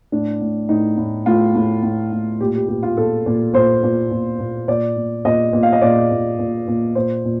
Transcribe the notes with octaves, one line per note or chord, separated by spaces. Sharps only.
A2 D4
A2
A2 D#4
A2
A2 F4
A2
A2
A2
A#2 G4
G4
A#2 G4
F4
A#2 A4
A#2
A#2 C5
A#2
A#2
A#2
A#2 D5
A#2
A#2 D#5
A#2
F5
D#5
A#2 D5
A#2
A#2
A#2
A#2 C5
A#2